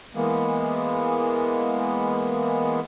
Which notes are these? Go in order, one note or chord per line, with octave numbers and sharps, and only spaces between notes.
E3 G#3 A#3 B3